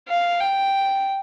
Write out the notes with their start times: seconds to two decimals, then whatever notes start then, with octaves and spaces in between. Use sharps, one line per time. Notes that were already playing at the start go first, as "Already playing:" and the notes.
0.09 F5
0.40 G5